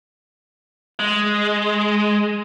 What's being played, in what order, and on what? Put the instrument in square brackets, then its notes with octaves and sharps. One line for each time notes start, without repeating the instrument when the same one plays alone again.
[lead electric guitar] G#3